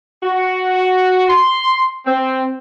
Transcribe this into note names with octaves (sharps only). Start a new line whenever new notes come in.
F#4
C6
C4